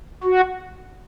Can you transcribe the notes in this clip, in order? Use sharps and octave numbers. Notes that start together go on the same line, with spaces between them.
F#4